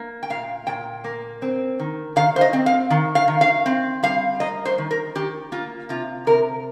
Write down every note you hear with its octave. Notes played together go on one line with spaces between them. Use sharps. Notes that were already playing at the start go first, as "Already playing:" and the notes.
Already playing: A#3
G5
A#2 F5
A#2 G5
A#3
C4
D#3
D#3 F5
C5
D#5
C4
F5
D#3
F5
D#3
F5
C4
G3 F5
A#3 D#5
C5
D#3
A#4
D#3 G4
A#3 F4
C3 F4
C3 A#4